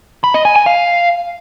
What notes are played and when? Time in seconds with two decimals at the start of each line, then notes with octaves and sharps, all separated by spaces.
0.24 B5
0.34 D#5
0.45 G#5
0.56 G#5
0.66 F5